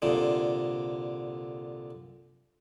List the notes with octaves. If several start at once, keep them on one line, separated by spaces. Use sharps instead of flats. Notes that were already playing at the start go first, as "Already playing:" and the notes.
C2 A#2 D3